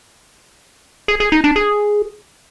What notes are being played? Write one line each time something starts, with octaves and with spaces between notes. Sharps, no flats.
G#4
G#4
D#4
D4
G#4